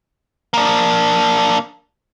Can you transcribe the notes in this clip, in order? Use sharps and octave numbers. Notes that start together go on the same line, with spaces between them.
A#3 D4